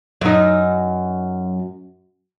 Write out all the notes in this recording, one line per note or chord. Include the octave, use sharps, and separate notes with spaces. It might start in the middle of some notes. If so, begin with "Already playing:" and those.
F#2 D#4